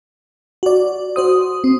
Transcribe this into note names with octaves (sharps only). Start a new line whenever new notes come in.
F#4 D5
F#4 C5 D#6
C4